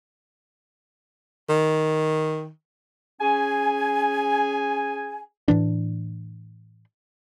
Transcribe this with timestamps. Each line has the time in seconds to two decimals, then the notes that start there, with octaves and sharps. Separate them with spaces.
1.50 D#3
3.20 C#4 G#4 G#5
5.48 A2 E3 D4